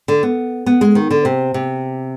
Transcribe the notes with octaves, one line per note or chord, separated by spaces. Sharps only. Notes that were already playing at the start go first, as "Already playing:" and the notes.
D3
B3
B3
G#3
D#3
D3
C3
C3